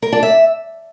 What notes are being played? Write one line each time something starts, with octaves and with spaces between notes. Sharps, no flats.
A#4
D4
E5